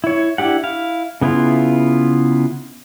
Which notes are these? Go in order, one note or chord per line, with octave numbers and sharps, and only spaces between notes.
E4 C#5
D4 E4 G4 F#5
E4 F5
C#3 B3 E4 F4